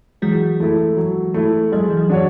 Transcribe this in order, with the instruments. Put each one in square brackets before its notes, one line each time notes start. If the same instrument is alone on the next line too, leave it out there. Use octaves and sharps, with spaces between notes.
[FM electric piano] E3 G#3 [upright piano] F#3
[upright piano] A3 E4 A4
F#3
A3 E4 A4
[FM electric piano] F#3 [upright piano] G#3
[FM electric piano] E3
F#3
[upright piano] D4 F#4 C#5